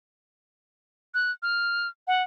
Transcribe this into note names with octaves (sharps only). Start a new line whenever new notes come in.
F#6
F6
F#5